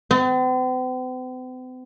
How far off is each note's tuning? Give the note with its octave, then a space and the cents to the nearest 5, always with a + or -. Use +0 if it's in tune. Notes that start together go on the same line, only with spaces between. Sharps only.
C4 -45